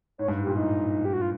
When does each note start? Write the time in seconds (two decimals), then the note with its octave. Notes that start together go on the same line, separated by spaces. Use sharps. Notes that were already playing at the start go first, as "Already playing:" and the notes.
0.18 G#2 C#5
0.28 G2
0.37 G#2
0.43 A#2 G4
0.56 A2 D#4
1.05 G4
1.13 F#4
1.22 F4